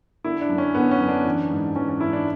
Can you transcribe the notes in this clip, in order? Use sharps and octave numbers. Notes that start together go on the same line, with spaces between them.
D3 E4
D4
F#2
C#4
D3 B3
C#4
F#2
D4
E3
G#2
E3 C#4
C#4
G#2 E4
D4